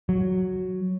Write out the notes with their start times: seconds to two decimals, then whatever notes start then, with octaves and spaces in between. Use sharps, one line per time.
0.09 F#3